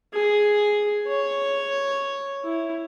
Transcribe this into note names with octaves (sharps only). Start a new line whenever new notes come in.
G#4
C#5
E4